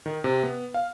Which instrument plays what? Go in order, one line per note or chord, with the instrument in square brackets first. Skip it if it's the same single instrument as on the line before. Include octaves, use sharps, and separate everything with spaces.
[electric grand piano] D#3
C3
B3
F5